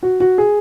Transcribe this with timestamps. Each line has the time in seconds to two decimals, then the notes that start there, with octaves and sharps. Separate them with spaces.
0.03 F#4
0.20 F#4
0.38 G#4